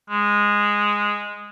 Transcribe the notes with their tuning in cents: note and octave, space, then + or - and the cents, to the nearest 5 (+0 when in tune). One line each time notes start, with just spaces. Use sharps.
G#3 -10